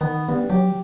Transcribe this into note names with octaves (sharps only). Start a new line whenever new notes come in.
D#3 B3
G2 B3
F#3 G4